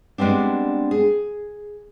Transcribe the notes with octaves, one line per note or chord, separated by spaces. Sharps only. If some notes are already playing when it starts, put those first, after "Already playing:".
G3 G#3 B3 C4 D4
G#4